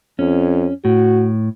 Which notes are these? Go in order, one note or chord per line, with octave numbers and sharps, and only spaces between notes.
F2 C#4
A2 F#4